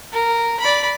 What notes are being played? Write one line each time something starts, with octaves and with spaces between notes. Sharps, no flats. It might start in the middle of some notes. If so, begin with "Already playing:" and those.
A#4
D5 B5